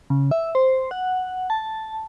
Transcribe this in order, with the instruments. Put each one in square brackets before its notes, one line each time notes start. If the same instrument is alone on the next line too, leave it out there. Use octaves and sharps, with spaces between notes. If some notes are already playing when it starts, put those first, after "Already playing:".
[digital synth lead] C#3
E5
C5
F#5
A5